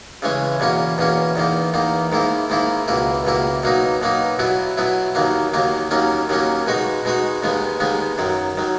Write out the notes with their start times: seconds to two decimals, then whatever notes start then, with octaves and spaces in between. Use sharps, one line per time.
0.22 C#3 E3 G#3 C#4
0.60 E2 B2 A#3 C#4
0.98 E2 B2 A#3 C#4
1.36 E2 D#3 A#3
1.74 E2 D#3 A#3
2.12 G#2 D#3 A#3 E4
2.50 G#2 D#3 A#3 E4
2.88 C#2 B2 A#3 E4
3.25 C#2 B2 A#3 E4
3.63 B2 F#3 A#3 D#4
4.02 B2 F#3 A#3 D#4
4.39 B2 F#3 B3 E4
4.77 B2 F#3 B3 E4
5.15 D#2 D#3 F#3 A#3
5.54 D#2 D#3 F#3 A#3
5.91 D#2 D#3 F#3 A#3 C#4
6.29 D#2 D#3 F#3 A#3 C#4
6.67 B2 G#3 D#4 F#4
7.05 B2 G#3 D#4 F#4
7.43 D#2 D#3 G#3 B3
7.80 D#2 D#3 G#3 B3
8.18 F#2 D#3 F#3
8.58 D#3 F#3